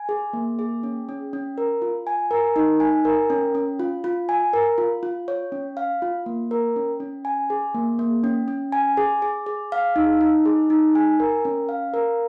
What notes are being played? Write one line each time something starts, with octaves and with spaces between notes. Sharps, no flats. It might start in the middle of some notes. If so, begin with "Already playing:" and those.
Already playing: G#5
G#4
A#3
G#4
C#4
C#4
C#4
A#4
F4
G#5
A#4
D#4
G#5
A#4
C#4
C#4
F4
F4
G#5
A#4
F4
F4
C#5
C#4
F5
F4
A#3
A#4
C#4
C#4
G#5
G#4
A#3
A#3
C#4
C#4
G#5
G#4
G#4
G#4
F5
D#4
D#4
G#4
D#4
G#5
A#4
C#4
F5
A#4